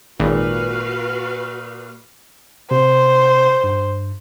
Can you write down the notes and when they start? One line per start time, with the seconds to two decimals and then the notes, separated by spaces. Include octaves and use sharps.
0.20 G#1 A#2 F#4 B4 F5
2.71 C3 C5
3.64 G2